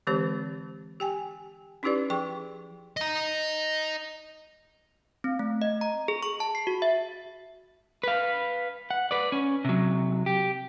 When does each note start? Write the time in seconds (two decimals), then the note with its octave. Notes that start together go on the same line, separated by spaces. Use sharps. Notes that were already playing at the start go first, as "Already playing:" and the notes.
0.07 D3 E3 G#3 C4 G4 C5
1.00 G4 G5 G#5
1.83 C#4 D#4 E4 G4 B4 D5
2.10 F3 G#4 G5 C#6
2.97 D#5 A#5
5.24 C4
5.39 A3
5.62 D#5
5.81 A#5
6.08 G#4
6.23 C#6
6.40 A5
6.55 C7
6.67 F#4
6.82 E5
8.03 B4 F5
8.91 F#5
9.11 B4 D5
9.32 C#4
9.65 C3 F#3
10.26 G4